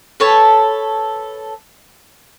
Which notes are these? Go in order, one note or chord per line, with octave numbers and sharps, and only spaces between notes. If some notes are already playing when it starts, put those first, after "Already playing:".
A4 B4 C#5 A5